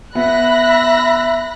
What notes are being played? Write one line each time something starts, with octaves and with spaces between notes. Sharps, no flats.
B3 E5 B5 F#6 A#6